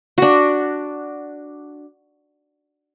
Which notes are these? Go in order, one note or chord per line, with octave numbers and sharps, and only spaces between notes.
D4 F#4